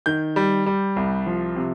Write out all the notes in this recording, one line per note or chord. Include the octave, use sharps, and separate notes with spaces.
D#3 G6
G3
G3
C2
F3
C3